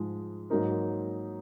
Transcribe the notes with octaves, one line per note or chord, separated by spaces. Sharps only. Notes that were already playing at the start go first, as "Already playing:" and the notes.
Already playing: G#2 F3 G#3
G#2 F#3 A#3 D#4 A#4